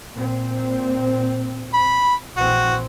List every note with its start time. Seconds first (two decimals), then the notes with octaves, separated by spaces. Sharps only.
0.16 A#2 C4
1.74 B5
2.37 A#1 E3 C4 F#4